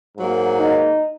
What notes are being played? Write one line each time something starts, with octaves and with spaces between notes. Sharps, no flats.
G#2 F#3 A#3
D#4